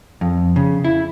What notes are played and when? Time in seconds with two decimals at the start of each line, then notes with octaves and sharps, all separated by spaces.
0.21 F2
0.56 C#3
0.84 E4